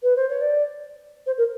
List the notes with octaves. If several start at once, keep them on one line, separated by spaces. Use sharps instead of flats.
B4
C5
C#5
D5
C5
A#4